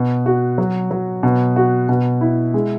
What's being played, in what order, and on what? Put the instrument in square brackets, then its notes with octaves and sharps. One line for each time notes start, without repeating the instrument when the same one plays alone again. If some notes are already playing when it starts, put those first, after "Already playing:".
Already playing: [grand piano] B2
F#4
F#3
F#3
B2
F#4
B2
E4
G#3